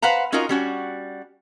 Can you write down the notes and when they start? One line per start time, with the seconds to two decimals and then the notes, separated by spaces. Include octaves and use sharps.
0.02 B4 C5 F5 F#5 A#5
0.32 C#4 D#4 F4 F#4 A#4 D#5
0.49 G3 C#4 F#4